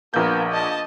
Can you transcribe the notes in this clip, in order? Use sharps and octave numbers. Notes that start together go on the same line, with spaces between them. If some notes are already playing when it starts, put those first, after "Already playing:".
A#1 A#3 B3 G6
D#5 A5